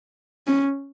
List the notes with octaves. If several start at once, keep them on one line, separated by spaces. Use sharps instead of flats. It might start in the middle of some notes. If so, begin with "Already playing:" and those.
C#4